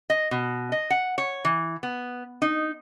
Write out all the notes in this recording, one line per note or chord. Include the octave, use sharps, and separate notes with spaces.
D#5
B2
D#5
F#5
C#5
E3
B3
D#4